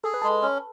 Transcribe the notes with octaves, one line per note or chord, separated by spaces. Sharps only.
G#4 A4
B4
G#3 A4
C#4